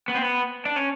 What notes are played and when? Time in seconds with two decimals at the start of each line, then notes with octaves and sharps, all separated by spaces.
0.09 B3
0.16 C4
0.23 B3
0.65 D4
0.76 C#4